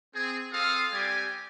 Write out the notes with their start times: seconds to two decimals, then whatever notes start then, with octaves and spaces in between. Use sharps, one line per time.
0.14 C4 G#4
0.53 C4 F4 A4 F5 A5 D#6
0.92 G3 C4 G4 D5 G#5